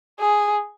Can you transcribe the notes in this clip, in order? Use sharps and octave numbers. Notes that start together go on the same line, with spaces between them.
G#4